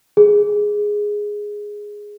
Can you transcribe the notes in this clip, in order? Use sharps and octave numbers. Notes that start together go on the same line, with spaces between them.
G#4